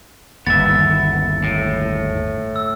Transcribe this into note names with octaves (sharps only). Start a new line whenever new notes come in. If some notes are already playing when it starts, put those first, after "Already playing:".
G1 D#2 B3 E5 A6
A2 A#6
E6